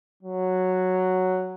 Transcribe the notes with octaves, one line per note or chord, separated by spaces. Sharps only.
F#3